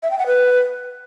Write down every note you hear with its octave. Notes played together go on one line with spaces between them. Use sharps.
E5
G5
F#5
B4